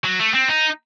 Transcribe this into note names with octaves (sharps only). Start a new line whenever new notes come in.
F#3
A3
C4
D#4